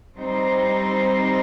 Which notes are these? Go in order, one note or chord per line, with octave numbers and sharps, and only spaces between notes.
G3 C4 D#4 C5